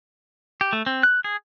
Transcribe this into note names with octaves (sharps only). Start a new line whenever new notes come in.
G4
A3
C4
F#6
G#4